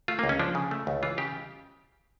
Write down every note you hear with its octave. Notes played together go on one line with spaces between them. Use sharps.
A3 F4
A#3
C#2
C#4
F3 D4
C#3
A3
C#2
E3 F4
C#3 G4